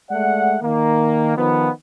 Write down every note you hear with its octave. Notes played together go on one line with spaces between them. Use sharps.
G#3 A3 D5 F#5
D#3 A#3
D#3 F3 B3